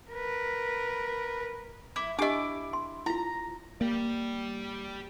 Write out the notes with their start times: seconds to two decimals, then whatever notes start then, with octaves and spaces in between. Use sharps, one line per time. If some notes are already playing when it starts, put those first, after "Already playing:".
0.10 A#4 B4
1.96 E4 D6
2.19 D4 E4 G4 D#5 D6
2.73 C6
3.06 E4 F4 A#5
3.81 A#3 G4 D5